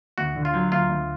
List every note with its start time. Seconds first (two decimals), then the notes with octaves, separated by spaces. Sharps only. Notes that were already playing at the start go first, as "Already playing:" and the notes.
0.18 D2 F#4
0.35 D3
0.45 F4
0.54 F#3
0.72 D2 F4
0.90 D2